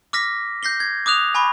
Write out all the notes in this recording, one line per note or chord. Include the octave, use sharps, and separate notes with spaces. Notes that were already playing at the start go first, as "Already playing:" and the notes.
D6 F6 A#6 B6
G6 A#6 C7 G7
G#6
D6 D#6 F#6 F7
G#5 B5 C#6